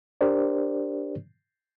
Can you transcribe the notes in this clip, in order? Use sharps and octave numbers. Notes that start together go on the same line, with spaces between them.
D4 G4 A#4 C5 D5